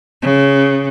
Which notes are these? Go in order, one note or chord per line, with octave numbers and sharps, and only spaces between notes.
C#3